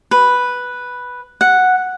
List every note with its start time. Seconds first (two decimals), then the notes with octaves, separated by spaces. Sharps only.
0.11 B4
1.41 F#5